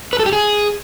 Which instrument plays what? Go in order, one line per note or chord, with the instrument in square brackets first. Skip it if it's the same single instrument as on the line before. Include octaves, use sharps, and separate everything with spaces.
[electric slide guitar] B4
A4
G4
G#4